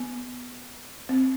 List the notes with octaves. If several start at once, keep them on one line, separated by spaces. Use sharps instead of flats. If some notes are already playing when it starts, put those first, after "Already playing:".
Already playing: B3
C4